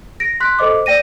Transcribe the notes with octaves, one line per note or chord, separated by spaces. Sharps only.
A#6 D7
C6 F#6 B6
A4 C5 D#5 D6
D5 G5 A#6 D#7